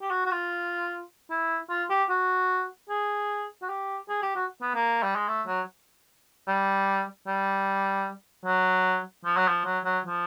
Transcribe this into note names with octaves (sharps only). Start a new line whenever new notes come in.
G4
F#4
F#4
F4
E4
F4
G4
F#4
G#4
F#4
G4
G#4
G4
F#4
B3
A#3
G3
G#3
A3
F#3
G3
G3
F#3
F3
F#3
F3
F#3
F#3
F3